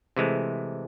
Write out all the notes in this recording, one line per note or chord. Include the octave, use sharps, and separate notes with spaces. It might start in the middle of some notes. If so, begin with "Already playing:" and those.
C3 E3 G#3 A3